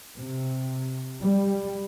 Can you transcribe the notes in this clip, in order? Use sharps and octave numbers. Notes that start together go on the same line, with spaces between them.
C3
G3